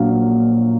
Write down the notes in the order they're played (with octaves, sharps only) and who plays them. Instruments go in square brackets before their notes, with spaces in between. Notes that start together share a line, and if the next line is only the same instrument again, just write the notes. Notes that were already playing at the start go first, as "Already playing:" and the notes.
Already playing: [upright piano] A#1 A#2 F#3 A#3 F5